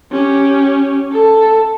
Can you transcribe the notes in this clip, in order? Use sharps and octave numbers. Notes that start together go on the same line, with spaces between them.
C#4 G4
A4